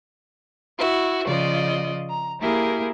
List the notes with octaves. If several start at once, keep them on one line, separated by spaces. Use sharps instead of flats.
E4 F#4 E5
C#3 F3 F4 D5 D#5
A#5
A#3 E4 G4 G#4 A#4